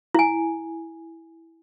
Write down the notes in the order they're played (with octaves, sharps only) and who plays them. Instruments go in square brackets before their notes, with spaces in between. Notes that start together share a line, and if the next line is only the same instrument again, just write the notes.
[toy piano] E4 G#5